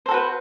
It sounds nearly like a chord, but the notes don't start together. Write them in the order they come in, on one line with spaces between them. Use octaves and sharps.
C5 A4 F#4 B4